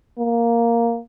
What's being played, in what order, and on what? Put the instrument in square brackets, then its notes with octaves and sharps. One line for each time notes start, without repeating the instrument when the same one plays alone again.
[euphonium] A#3